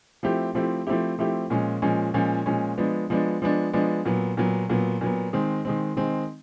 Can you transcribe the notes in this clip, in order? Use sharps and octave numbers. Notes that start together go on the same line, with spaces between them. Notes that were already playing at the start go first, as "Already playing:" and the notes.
F3 A3 C4 E4 G4
F3 A3 C4 E4 G4
F3 A3 C4 E4 G4
F3 A3 C4 E4 G4
A#2 F3 G#3 C#4
A#2 F3 G#3 C#4
A#2 F3 G#3 C#4
A#2 F3 G#3 C#4
F3 G#3 B3 D4
F3 G#3 B3 D4
F3 G#3 B3 D4
F3 G#3 B3 D4
A#2 F#3 B3
A#2 F#3 B3
A#2 F#3 B3
A#2 F#3 B3
D#3 G#3 C4
D#3 G#3 C4
D#3 G#3 C4